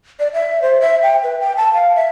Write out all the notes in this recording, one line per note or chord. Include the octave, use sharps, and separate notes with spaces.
D5
E5
C5
E5
G5
B4
G5
A5
F5
E5